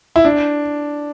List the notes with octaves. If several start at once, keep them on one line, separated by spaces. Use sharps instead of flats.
E4
D4